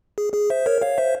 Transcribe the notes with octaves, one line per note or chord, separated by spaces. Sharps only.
G#4
G#4
C5 E5
A#4 C#5
C#5 F5
C5 E5